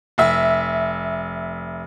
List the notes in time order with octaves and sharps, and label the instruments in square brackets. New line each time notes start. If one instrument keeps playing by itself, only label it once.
[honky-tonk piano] F1 E5